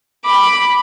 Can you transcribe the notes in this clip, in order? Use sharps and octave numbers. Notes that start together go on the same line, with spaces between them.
B5 D6